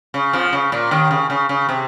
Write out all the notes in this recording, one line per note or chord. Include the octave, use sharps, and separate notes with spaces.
C#3
F2 F3
C#3
A#2
D#2 D#3
C#3
C#3
C#3
C3